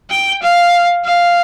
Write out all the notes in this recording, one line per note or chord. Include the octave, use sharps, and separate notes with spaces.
G5
F5
F5